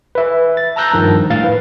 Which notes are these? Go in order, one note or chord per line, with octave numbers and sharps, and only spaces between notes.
B4 E5
A6
A5 A#5 E6 F#6 G6 A#6
G2 D#3 F3
A2 F5 A6
B4